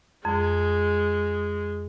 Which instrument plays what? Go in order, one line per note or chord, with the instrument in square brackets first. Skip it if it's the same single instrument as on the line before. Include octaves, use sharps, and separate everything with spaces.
[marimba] F2 [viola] G#3